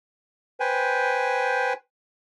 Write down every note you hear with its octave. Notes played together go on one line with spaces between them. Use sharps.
B4 C5 G5 G#5